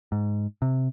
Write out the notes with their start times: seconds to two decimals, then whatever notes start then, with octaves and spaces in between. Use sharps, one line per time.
0.12 G#2
0.62 C3